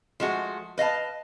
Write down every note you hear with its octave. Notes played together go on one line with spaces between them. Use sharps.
F3 G#3 A3 F#4
B4 D#5 F5 A5